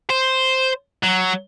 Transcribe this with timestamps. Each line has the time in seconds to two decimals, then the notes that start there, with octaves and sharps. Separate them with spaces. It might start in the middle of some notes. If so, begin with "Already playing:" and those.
0.10 C5
1.04 F#3